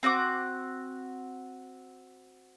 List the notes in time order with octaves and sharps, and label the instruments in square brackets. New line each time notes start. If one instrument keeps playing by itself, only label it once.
[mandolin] C4 F#4 F#5 D6